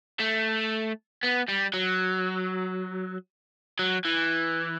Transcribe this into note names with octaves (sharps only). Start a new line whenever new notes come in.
A3
B3
G3
F#3
F#3
E3